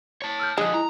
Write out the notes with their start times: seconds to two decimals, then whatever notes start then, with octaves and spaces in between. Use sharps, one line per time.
0.22 C#5 A5
0.39 E6 F6 G6
0.58 D3 F3 G#3 D#6 F#6
0.74 E4 A#5